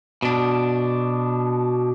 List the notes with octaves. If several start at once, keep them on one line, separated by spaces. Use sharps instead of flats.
B2 D4